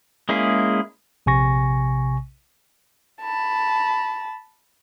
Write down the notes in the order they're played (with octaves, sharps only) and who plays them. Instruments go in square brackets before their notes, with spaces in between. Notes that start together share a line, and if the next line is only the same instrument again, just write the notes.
[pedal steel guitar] G#3 A#3 C#4 E4 G#4
[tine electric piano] A#1 C3 G#5 C#6 A#6
[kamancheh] A5 B5